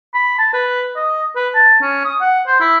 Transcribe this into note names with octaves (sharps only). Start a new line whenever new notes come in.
B5
A5
B4
D#5
B4
A5
C#4
D#6
F#5
C5
E4